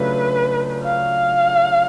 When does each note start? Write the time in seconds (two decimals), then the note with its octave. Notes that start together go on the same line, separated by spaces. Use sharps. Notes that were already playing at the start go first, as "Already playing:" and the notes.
Already playing: C#3 F#3 A3 D4 F4 B4
0.83 F5